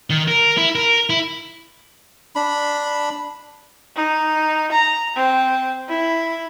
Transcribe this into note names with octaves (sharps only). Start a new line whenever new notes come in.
D#3
A#4
E4
A#4
E4
D4 B5
D#4
A#5
C4
E4